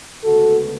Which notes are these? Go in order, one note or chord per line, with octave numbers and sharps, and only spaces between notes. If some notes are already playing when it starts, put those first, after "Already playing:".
D2 C#3 G#3 B3 F#4 A4